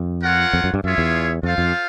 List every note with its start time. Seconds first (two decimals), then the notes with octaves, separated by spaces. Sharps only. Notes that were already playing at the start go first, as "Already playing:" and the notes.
Already playing: F2
0.23 F4 A#4 C#5 F#5
0.53 F2
0.64 F#2
0.74 G2
0.84 F#2 F4 G#4 C#5 E5
0.98 E2
1.43 F2 F4 A4 C5 F5
1.58 F2